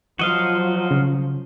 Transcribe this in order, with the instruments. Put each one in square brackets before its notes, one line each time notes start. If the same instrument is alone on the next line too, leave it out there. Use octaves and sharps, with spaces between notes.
[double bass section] F3 F#3 [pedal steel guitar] F#4 D#5 F5
[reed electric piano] C#3